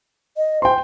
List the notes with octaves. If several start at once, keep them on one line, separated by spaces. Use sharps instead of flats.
D#5
C5 G5 C6